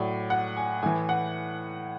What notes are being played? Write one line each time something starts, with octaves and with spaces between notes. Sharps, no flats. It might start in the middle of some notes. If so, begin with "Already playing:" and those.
Already playing: A2 F#3 D5
F#5
G#5
A2 E3 G#5
F#5